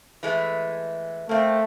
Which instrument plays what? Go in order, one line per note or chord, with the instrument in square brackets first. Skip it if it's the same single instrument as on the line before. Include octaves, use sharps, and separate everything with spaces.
[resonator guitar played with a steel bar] E3 G#3 A3
[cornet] A3 [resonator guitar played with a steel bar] A#3 C4